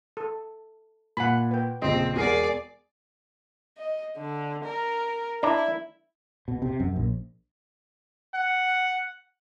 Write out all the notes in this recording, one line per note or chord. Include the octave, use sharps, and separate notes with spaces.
A4
A#2 F#5 G#5 B5
B4 G5
A#1 C#3 C4 D#5
E1 F#4 G#4 A#4 D5 C7
D#5
D3
A#4
D4 E4 D5 A#5
B2
C3
F#2
A#1
F#5